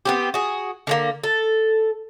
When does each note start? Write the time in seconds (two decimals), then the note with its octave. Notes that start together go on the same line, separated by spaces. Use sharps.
0.05 B3 C4 G4
0.34 F#4 G#4
0.87 D3 G#3 A#3
1.24 A4